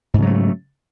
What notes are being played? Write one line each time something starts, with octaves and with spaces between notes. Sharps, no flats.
G#2 C#3 F#3 A3